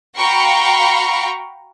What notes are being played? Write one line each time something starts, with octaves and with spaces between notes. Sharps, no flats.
F#4 F5 G5 A#5 B5 C#6